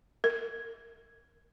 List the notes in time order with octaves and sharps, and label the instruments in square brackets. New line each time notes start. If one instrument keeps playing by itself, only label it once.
[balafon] A#4